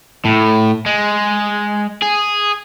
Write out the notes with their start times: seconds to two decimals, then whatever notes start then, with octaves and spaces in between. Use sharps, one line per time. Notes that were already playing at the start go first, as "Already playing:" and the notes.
0.25 A2
0.86 G#3
2.02 G#4